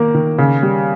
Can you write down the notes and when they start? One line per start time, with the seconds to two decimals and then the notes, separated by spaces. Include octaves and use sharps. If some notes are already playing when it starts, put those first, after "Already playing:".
Already playing: D#3 A#3 A#4
0.15 D#3
0.38 C#3
0.63 G3